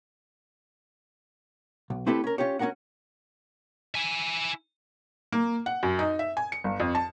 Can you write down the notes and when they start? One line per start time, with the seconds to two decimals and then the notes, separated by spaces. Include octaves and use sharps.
1.90 B1
2.06 A3 C4 E4 G4 A4 B4
2.24 C#4 A#4
2.38 C#4 F4 G4 C#5
2.59 C#4 D4 F#4 A#4 F#5
3.95 E4 G#5
5.32 A#3
5.66 F#5
5.83 F#2
5.99 D#4
6.19 E5
6.37 G#5
6.52 C#7
6.64 G1
6.80 F2
6.95 A5